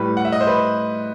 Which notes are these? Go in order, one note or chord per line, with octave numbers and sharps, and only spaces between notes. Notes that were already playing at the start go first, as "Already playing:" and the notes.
Already playing: A2 G3 B4
F#5
E5
D#5
C5
B4